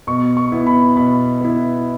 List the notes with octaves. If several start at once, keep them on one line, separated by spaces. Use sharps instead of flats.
B2 C#6
C#6
B3 E4
B5
B2 B5
B3 E4